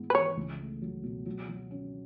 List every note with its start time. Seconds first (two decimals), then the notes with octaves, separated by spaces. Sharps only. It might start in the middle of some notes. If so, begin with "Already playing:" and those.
Already playing: G#2 B3 E4
0.10 B4
0.14 E3 C#5
0.37 C#2
0.59 A3
0.82 F#3
1.04 B2
1.26 F#3
1.49 F#3
1.71 C#4